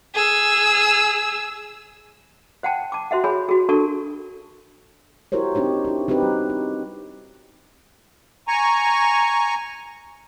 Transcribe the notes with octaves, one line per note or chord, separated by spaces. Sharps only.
G#4 E6
C5 F#5 G5 A5
A5 D6
F#4 C5 E5 F#5
G#4 C#5 G#5 B5
F#4 G#4
D4 A4 A#4 A5 C#6
E4 F#4 G4 A#4 C5 C#5
C4 D4 D#4 G4 C#5
E4 G4
C4 D#4 F#4 G4 B4
G3
G4
G#5 A#5 C#6